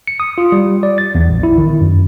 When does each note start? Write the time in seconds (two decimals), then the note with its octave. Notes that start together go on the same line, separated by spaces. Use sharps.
0.07 C#7
0.20 D#6
0.38 F4
0.52 G3
0.83 D5
0.98 A6
1.15 E2
1.30 A#1
1.43 E4
1.58 D#3
1.81 F#2